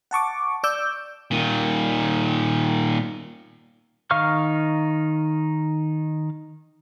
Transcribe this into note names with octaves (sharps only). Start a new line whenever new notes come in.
F#5 A5 C#6 D6
D5 D6 E6 G6
A#2 D#3
D#3 D#4 F5 C#6 F6